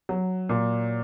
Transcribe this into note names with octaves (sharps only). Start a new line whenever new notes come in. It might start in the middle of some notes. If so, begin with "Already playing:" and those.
F#3
A#2